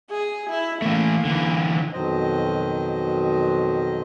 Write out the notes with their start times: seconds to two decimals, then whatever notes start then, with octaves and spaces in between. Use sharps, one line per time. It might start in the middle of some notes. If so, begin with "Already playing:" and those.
0.10 G#4
0.50 E4
0.82 E3 A3 A#3
1.25 D3 E3
1.93 F2 B2 D#3 F#3 C5 D#5